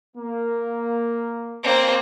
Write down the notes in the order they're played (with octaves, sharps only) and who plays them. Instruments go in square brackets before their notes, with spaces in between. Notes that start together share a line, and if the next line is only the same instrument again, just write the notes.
[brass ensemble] A#3
[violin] A#3 C4